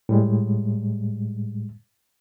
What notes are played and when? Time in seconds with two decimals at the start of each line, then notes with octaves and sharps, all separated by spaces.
0.09 A2 G3 G#3